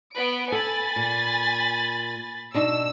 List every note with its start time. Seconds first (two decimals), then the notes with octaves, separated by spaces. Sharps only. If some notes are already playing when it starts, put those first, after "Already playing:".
0.15 B3 B4 D7
0.52 A4 G#5 B5 A6
0.96 A#2
2.54 B2 D4 D#4 E6